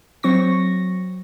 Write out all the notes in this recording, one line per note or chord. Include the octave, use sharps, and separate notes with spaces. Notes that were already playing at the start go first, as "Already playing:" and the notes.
F#3 C4 C#6 A#6